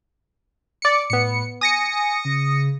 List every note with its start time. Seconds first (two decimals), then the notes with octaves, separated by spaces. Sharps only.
0.82 D5 C#7
1.10 A2 B3 C#7
1.61 G#5 D#6 A#6 C#7
2.25 C#3